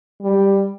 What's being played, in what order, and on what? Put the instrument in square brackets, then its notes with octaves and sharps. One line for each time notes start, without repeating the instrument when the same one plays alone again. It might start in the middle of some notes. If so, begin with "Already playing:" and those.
[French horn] G3